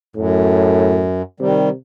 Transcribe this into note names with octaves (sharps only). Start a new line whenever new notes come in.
F#2 A2
C3 D#3 G3